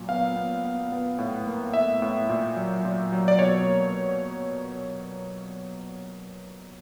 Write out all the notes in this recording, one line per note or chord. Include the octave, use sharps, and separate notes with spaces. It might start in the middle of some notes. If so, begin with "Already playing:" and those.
Already playing: A#2 F#3
B3 F5
B3
B3
B3
A2
A#3
A2 E5
A2
A#2
F#3
A#2
F#3
D5
B2 C#5
A#3